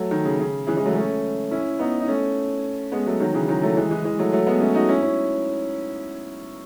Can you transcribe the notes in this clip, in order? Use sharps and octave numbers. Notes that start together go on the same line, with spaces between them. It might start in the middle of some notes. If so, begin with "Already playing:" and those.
Already playing: F#3 A3
D#3
C#3
C#3
C#3 E3
E3 G#3
F#3 A3
A3 C#4
C#4 E4
B3 D#4
D#4
A3 C#4
G#3 B3
F#3 A3
D#3 F#3
C#3 E3
D#3 F#3
F#3 A3
E3 G#3
E3 G#3
E3 G#3
F#3 A3
F#3 A3
G#3 B3
A3 C#4
D#4 F#4
C#4 E4
C#4